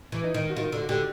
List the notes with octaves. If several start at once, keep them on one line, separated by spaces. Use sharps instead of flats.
E3
D#4
D#3
F#4
D#3 F4
D3
F#4
D3 G4